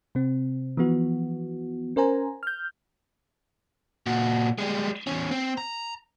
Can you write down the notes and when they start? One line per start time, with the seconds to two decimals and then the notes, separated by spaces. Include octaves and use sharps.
0.15 C3 C4
0.77 E3 F3 B3 F#4
1.96 C#4 A#4 C5 G#5 A#5
2.43 F6 G6
4.06 A#2 F#4
4.58 G3 G#3
5.07 E2 C#4
5.31 C4
5.57 A#5